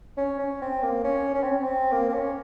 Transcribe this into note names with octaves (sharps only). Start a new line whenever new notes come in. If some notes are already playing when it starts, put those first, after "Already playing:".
C#4
C#4
C4
A#3
C#4
C#4
C4
C#4
C4
A#3
C4
C#4